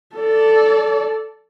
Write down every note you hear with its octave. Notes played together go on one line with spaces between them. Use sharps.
A4 D5